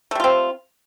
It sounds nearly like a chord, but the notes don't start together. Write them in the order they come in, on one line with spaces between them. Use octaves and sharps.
A3 G3 F4 C4